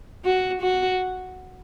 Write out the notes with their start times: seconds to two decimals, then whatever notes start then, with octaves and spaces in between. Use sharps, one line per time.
0.25 F#4
0.62 F#4